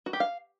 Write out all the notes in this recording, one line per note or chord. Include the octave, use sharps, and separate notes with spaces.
F#4
G4
F5